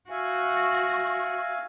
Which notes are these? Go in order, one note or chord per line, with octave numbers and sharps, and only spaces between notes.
F#4 E5 F5 G#5